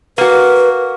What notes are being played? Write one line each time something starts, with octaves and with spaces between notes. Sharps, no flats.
A#3 F#4 B4